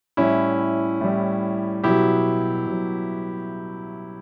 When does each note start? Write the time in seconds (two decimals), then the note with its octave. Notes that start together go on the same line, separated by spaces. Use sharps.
0.17 A2 G3 C#4 E4
1.01 A2 G3
1.83 B2 F#3 E4 G4
2.67 B2 F#3